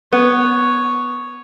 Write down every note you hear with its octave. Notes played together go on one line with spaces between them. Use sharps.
B3 C#5